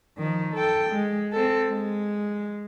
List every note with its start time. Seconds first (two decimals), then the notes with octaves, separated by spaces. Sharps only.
0.18 D#3 F3
0.54 A4 G5
0.90 G#3
1.32 C4 A4
1.68 G#3